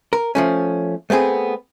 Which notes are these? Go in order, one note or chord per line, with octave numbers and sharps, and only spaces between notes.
A#4
F3 A3 C#4
A3 B3 C4 G#4